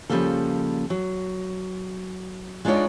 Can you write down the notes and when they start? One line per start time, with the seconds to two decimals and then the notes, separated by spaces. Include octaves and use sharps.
0.09 C#3 E3 F3 G3 A#3 A4
0.90 F#3
2.65 G#3 D4 D#4 F4 C#5 D5